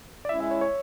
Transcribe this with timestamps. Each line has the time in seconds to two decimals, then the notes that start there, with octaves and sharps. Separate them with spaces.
0.25 D5
0.29 G#3 C#4 E4 E5
0.40 E5
0.51 C#5
0.61 C#5